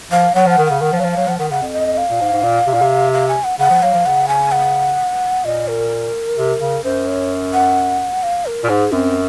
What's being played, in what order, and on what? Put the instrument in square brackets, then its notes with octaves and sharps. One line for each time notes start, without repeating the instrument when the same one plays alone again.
[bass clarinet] F3 [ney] F5
[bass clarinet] F#3 [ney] F#5
[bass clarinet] F3
[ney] F#5
[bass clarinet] D#3
[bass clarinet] C#3 [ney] F#5
[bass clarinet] D#3 [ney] F#5
[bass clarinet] F3
[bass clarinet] F#3 [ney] F5
[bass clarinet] F3
[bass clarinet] F#3 [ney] F5
[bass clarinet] F3 [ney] F#5
[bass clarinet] D#3 [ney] F#5
[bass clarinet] C#3 [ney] F#5
[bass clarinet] F2
[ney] D#5
F5
[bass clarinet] A#2
G#2
G#2
A#2
C3
A#2
C3
[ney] F5
G#5
F#5
[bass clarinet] C#3 [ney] F#5
[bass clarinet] F3
[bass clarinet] F#3 [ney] F5
[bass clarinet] F3
[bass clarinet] C#3 [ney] F#5
[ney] G#5
F#5
[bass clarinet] A#2 [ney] D#5
[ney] A#4
[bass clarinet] C3
C#3
[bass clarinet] F#2 [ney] C5
[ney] C#5
F#5
F5
A#4
[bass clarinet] A#2
[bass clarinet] G#2 [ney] G#4
[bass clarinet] F#2 [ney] C4